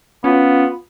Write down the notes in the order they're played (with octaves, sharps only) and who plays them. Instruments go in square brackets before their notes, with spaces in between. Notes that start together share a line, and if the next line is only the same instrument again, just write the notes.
[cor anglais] B3 [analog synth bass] C#4 [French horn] F4